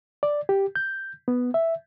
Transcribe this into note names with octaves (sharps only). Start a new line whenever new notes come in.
D5
G4
G6
B3
E5